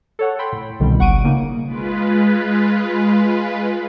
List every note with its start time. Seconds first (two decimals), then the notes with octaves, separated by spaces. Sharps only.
0.19 A4 C#5 F#5
0.39 G5 B5 C6
0.52 A2
0.80 C2 B2 D3 D#3 G3
0.99 G1 F#5 C#6 D7 D#7
1.24 C#3 A#3 D#4
1.66 G#3 F4 B4